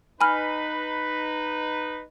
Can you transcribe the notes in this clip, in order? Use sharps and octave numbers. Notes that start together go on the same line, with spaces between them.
D#4 B4 G#5 B5 F6